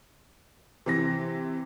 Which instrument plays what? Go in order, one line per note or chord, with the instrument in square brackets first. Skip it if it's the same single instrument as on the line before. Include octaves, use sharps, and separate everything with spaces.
[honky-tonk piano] C3 E3 A#6